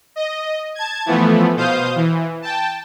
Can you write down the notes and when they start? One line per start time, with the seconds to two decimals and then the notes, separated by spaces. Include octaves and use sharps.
0.16 D#5
0.75 A5 G#6
1.06 E3 F3 A3 B3
1.56 B2 C5 F5 D#6 G6
1.96 E3
2.42 G5 A5